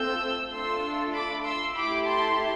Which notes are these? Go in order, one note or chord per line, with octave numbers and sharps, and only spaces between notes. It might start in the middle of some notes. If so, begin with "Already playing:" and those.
Already playing: A3 C4 F4 A4 E6 G6
A3 D4 F4 A4 C6 E6
B5 D6
C6 E6
A3 E4 G4 B5 D6
A5 C6